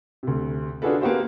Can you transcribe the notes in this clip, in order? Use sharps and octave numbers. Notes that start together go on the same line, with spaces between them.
D2 C3
D4 F4 F#4 G#4 A4 B4
A#3 B3 F#4 G4 C5